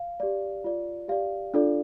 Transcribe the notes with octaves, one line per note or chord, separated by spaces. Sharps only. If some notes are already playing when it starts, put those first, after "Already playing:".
Already playing: F5
G4 D5
F4 D5
G4 D5 F5
D4 F4 A4 D5